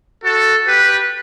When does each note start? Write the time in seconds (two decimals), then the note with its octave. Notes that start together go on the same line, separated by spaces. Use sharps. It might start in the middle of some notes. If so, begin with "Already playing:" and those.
0.24 F#4 A4
0.67 G4 B4